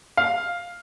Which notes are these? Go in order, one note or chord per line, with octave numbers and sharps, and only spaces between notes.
F5